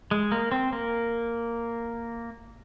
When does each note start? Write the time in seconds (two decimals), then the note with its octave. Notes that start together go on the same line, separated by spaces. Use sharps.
0.11 G#3
0.32 A#3
0.52 C4
0.73 A#3